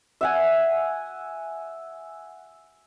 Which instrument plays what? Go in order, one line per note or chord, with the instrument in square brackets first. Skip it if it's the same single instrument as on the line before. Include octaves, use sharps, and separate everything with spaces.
[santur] E5 F#5 G#5